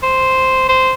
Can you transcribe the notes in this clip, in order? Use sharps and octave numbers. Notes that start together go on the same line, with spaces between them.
C5
C5